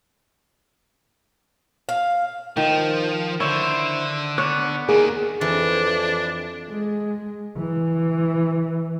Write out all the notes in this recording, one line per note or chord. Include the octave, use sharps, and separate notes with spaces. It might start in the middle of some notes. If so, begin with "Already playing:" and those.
F5
D#3 F3
D3 E4 C5 C#5
B3 C#5 D6 F#6
D#2 D#3 A#3 G#4
F2 E3 D4
G#3
E3